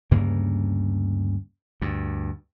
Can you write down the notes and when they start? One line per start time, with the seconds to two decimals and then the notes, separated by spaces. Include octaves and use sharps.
0.11 D2 G2 C#3 A#3
1.82 D2 G2